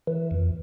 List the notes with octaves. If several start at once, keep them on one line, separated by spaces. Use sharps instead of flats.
E3
F2